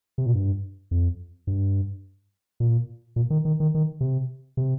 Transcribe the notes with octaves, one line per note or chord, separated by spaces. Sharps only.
C3
A#2
G2
F2
G2
A#2
A#2
D#3
D#3
D#3
D#3
C3
C3